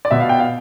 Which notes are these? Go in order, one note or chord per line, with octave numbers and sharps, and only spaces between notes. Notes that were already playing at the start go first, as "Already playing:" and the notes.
D5
B2 E5
F5
G5
F5